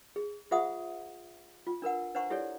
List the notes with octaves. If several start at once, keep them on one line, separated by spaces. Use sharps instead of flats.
G#4
F4 G#4 C5 E5 F#5 D#6
F4
D4 A#4 B4 F#5
D4 B4 C5 F#5 A#5 C#6
E4 G4 A4 C#5 D5